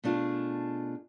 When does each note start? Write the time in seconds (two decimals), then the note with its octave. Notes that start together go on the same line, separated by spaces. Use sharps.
0.04 B2 A3 D4 F4 G#4